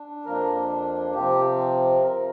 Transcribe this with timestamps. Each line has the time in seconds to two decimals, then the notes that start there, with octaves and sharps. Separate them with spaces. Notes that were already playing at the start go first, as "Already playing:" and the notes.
Already playing: D4
0.25 F2 F3 A#3 D4 A#4
1.14 C3 F3 C4 G4
2.02 C3 F3 C4 A#4